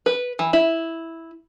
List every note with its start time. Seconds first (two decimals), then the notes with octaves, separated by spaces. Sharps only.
0.06 B4
0.39 E3
0.53 E4